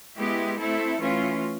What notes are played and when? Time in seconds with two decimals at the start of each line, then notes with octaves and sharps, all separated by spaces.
0.17 G#3 B3 E4 G4
0.59 A3 C4 E4 A4
1.00 E3 A3 C#4 F4